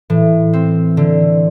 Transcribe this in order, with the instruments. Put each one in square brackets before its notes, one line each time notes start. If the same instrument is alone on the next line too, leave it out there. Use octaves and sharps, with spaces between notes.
[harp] A2 [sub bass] E3
[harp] C4
D3